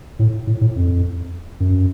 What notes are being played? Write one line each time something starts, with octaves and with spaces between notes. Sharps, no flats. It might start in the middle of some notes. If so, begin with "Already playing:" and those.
A2
A2
A2
F2
F#2